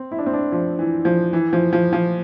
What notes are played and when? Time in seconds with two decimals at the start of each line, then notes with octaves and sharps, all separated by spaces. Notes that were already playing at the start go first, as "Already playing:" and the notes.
Already playing: C4
0.11 E4
0.19 D4
0.26 C4
0.34 D4
0.52 F3
0.79 E3
1.05 F3
1.33 E3
1.53 F3
1.73 F3
1.93 F3